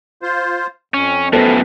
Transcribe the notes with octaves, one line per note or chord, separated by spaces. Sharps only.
F4 C5
F2 C#4
F#2 A2 B3 A4 C5